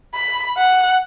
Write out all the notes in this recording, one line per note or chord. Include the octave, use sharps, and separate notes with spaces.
B5
F#5